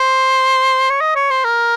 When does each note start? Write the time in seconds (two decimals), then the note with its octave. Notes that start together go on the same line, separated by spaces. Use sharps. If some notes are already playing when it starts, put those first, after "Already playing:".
Already playing: C5
0.90 C#5
1.00 D#5
1.15 C#5
1.30 C5
1.44 A#4